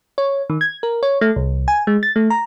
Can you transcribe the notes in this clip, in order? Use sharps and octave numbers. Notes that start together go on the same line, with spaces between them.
C#5
D#3
G#6
A#4
C#5
A3
C2
G#5
G#3
A6
A3
A#5